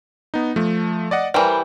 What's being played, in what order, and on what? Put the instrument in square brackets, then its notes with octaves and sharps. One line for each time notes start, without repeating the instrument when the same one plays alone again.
[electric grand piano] B3 D#4
F3 A3
D5 D#5 F#5
[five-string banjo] E3 G3 [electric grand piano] A#4 C5 G5